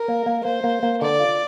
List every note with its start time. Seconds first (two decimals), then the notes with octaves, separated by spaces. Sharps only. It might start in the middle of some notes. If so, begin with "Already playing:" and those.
Already playing: A#4
0.08 A#3
0.26 A#3
0.45 A#3 C5
0.64 A#3
0.83 A#3
1.01 D3 D5
1.20 F4